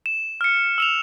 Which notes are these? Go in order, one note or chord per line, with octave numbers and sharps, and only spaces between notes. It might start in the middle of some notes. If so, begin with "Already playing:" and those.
E7
F6 C#7
E6 E7 F7